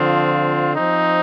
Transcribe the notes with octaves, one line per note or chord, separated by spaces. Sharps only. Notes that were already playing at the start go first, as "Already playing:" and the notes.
Already playing: D3 F3 C4 F4
F3 C4 D#4